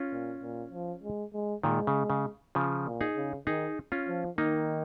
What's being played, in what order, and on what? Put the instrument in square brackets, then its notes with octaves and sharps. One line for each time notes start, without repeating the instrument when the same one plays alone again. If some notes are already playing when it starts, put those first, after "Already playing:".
Already playing: [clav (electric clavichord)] C#4 F4
[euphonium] A#2
A#2
F3
G#3
G#3
[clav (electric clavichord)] A#2 D#3 [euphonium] G#3
[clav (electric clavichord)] C#3
C#3
C#3 F3
[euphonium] A#2
[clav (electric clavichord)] D#4 G#4
[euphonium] C#3
[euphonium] D#3 [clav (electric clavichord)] D#4 G#4
[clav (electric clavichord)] C#4 F4
[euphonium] F3
[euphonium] D#3 [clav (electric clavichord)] A#3 D#4